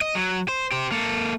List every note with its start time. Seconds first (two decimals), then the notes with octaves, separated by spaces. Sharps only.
0.01 D#5
0.15 F#3
0.48 C5
0.72 G4 C5
0.92 A#3 A4